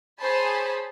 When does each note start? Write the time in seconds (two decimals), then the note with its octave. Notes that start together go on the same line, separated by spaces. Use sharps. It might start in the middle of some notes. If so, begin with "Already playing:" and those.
0.20 G#4 C5 C#5 G#5 A5 B5